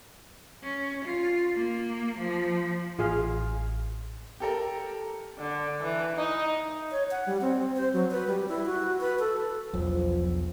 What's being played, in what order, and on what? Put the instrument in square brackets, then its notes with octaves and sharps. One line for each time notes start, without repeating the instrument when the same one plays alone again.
[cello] C#4
F4
A#3
F3
[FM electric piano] A1 [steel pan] F4 G#4 F5
[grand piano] G4 A4 A#4
[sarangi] D3
E3
D#4
[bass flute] C#5
F#5
G3
C4
C5
F#3
B4
G3
E4
F#4
B4
A4
[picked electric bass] E1 B1 [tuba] F3